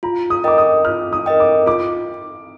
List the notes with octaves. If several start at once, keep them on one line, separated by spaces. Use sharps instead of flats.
F4 A#5
D#6
A#4 D#5 G5 D6
D#6
F4 F6
D#6
A#4 D#5 G5
D6
F4 D6